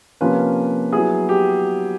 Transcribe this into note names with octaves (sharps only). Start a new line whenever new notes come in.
C3 F3 A#3 C#4 F4 B4
F#3 B3 E4 G#4
G4